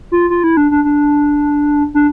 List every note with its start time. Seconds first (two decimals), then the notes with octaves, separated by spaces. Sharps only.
0.12 F4
0.30 F4
0.44 E4
0.57 D4
0.71 D4
0.84 D4
1.94 D4